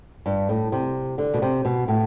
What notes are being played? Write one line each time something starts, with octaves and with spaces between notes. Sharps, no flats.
G2
A2
C3
D3
B2
C3
B2
A2